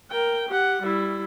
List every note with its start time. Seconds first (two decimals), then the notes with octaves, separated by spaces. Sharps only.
0.11 A#4 G5
0.49 G4 F#5
0.83 G3 E4